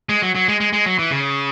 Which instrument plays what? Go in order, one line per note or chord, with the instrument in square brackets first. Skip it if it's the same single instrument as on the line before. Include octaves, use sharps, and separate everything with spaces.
[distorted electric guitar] G#3
F#3
F#3
G#3
G#3
G#3
F#3
E3
C#3